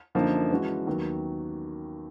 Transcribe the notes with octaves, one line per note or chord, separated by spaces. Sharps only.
F#2 D3 F3 A#3 D#4
E3 G#3 C#4 F#4
D#2 D#3 F#3 B3